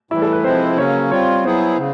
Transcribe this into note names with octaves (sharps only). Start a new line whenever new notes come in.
A2 E3 G3 E4
A4
B4
C3 F3 G#3 C4 E4 C5
C#3 F#3 A#3 C#4 C#5
G3 C4 F4 C#5
F#3 B3 E4 G#4 C5
C#3